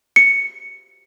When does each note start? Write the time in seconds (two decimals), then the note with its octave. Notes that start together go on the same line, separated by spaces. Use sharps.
0.16 C#7